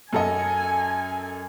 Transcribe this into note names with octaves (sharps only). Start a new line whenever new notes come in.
F#2 A4 D#5 G#5